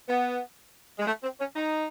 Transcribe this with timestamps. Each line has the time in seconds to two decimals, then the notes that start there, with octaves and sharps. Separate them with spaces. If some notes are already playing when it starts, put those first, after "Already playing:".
0.09 B3
0.99 G#3
1.06 A3
1.23 C4
1.39 C#4
1.56 D#4